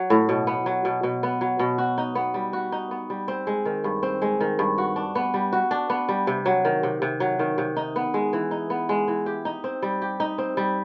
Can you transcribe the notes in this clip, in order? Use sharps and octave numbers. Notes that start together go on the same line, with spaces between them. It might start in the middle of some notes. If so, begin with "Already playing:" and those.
Already playing: F#3
A2
B2
B3
F#3
B2
B2
B3
F#3
B2
F#4
D#4
B3
G3
F#4
D#4
B3
G3
C4
G#3
D#3
G2
C4
G#3
D#3
G2
F#4
D4
B3
G3
F#4
D4
B3
G3
C3
F#3
D#3
C3
C3
F#3
D#3
C3
D#4
B3
G#3
E3
D#4
B3
G#3
E3
G4
D#4
C4
G3
G4
D#4
C4
G3